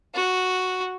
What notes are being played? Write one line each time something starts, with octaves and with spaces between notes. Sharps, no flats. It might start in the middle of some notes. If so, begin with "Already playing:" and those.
F#4